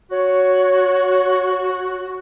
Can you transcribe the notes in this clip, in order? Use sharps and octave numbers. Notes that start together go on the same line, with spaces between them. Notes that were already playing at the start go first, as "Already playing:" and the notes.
F#4 C#5